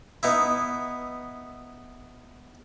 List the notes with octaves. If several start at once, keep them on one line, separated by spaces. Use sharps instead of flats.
B3 D#4 E4